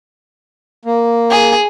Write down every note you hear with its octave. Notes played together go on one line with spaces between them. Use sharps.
A#3
G#4